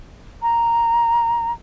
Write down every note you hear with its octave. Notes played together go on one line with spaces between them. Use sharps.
A#5